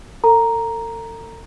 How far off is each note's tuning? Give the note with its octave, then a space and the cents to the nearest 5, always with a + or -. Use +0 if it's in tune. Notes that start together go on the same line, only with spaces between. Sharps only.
A4 +40 A#5 +0